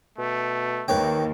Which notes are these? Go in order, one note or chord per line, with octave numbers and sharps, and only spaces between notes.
B2 A3
D#2 D#3 B4 C#5 G5